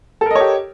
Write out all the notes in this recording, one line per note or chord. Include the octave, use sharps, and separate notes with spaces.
G4 A4 A#4 C#5 D#5